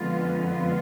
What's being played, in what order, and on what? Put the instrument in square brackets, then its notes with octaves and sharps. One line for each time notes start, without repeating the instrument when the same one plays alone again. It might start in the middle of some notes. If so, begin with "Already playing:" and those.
Already playing: [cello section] F2 D3 G#3 B3 F4
F4